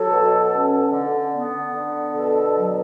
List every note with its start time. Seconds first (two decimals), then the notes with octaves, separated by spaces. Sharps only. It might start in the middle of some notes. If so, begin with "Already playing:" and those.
Already playing: F#3 A4
0.09 B2
0.50 C#4
0.91 D3
1.32 B3
1.73 D3
2.13 B2 A4
2.54 F#3